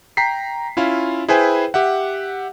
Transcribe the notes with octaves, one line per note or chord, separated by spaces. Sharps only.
G5 A#5 B6 C7
C#4 E4 F4 F5
E4 G#4 B4 C5 G5 G#5
G4 E5 F#5